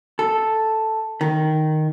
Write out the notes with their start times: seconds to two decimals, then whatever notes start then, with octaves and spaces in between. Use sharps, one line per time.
0.19 A4
1.21 D#3